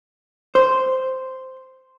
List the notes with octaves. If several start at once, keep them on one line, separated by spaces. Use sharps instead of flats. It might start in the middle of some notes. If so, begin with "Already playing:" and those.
C5